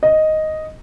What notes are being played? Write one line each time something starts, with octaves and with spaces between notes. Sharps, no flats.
D#5